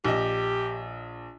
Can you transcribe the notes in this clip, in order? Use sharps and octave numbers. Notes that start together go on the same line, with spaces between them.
A#1 G4 D#5